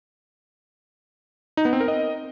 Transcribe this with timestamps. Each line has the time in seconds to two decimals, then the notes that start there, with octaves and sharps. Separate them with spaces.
1.57 D#4
1.65 B3
1.73 C4
1.80 A#4
1.88 D#5